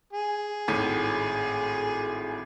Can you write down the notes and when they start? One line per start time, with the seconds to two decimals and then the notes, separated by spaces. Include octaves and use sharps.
0.13 G#4
0.68 G#1 A2 D#7